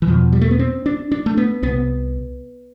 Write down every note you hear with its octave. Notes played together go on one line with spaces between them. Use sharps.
E3
E2 B2 F3
G3
A3
B3
C4
D4
D4
A3
B3
C2 C3 B3